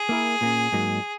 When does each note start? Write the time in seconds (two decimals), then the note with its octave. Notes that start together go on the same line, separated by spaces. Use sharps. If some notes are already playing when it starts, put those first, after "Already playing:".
Already playing: G#4
0.09 A#3 E4 A#4
0.41 A#2 A#3 C#4
0.72 G#2 F#3 A#3 D#4